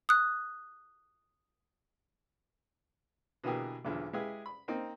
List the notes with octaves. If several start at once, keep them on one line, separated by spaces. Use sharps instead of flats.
D#6 F#6
B2 D3 E3 A#3 G4 G#4
B1 E2 D3 F3
G#3 E4 G4 G#4 B4 F5
B5
A#3 C4 D#4